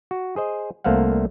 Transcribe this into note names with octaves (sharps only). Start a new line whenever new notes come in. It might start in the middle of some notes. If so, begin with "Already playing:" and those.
F#4
G#4 C5 D#5
C2 A3 A#3 C5 F5 F#5